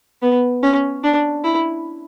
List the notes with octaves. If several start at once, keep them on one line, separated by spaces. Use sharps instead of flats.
B3
C#4
D4
E4